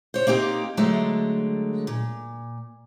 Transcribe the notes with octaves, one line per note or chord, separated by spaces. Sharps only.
C5 C#5
A#3 C4 D#4 G4
D3 F#3 G#3 A3
A#2